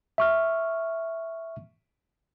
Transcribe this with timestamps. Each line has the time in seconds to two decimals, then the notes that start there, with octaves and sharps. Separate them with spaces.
0.18 E5 C#6 F6